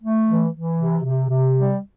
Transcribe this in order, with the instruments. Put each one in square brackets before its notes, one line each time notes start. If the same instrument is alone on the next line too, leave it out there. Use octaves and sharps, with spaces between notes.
[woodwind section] A3
E3
E3
C3
C3
C3
G3